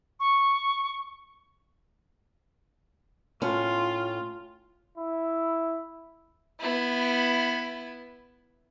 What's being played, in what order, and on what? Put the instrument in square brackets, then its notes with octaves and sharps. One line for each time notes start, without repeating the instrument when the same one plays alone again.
[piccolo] C#6
[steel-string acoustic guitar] A2 C#4 [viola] F4
[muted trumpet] E4
[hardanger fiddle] B3 E4